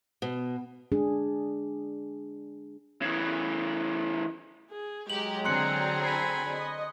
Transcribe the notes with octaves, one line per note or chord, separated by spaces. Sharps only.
B2
G#3 D4 G#4
C#3 E3
G#4
F#3 G#3 G4 G5 A#5 F#7
D3 C4 G#4 C6 F#6 C#7
G#5 B5
D#5